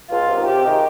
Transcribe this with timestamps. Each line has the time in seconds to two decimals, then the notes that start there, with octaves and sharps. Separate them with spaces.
0.10 C#2 F4
0.29 C3 D#3
0.47 C3 G4
0.65 D#3 G#3 D#4